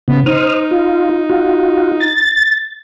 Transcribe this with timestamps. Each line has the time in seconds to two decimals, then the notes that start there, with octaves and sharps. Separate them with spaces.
0.08 C#3 B3
0.26 D#4 C5 D#6 F6
0.71 F4
1.30 F4 F#4
2.00 A6